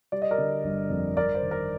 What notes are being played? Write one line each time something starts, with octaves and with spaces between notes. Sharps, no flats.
G3 D5
D#5
A#4 D5
D3
G1
F2
G1 A#4 D5
C5
D#3
A#4